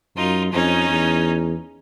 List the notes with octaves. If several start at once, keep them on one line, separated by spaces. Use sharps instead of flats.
F#2 D#4 F4
F2 C#4 D#4
E2